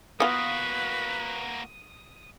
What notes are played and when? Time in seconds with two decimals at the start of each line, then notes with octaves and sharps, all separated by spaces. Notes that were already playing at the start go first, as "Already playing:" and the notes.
0.20 A#3 B3 F4 F#4 B4 D#6